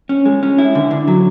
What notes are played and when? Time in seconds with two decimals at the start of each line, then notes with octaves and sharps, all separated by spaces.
0.09 C#4
0.26 G#3
0.43 C#4
0.58 E4
0.75 D3
0.91 D3
1.08 F#3